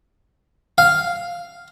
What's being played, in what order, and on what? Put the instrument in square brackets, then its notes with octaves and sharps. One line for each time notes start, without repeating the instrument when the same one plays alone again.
[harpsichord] F5